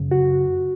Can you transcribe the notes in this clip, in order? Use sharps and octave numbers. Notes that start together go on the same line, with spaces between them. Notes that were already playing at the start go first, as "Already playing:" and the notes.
Already playing: F#2 C#3
F#4